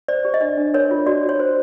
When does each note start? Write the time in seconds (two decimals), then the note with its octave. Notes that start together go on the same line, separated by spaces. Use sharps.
0.08 C5 D5
0.25 G4
0.34 D#5
0.41 D4 D5
0.57 D4
0.74 A#4 C#5
0.91 F4
1.07 F#4 D5
1.23 F#4
1.29 C#5
1.40 C5